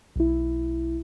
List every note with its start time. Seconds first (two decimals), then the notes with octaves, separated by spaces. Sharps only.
0.16 B1 E4